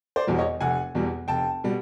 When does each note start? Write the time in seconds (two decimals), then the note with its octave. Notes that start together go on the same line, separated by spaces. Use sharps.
0.16 C5 D5
0.27 E2 B2 G3
0.38 C#5 D#5
0.61 F1 F#5 G#5
0.95 E2 B2 G3
1.28 F1 G5 A5
1.64 B2 G3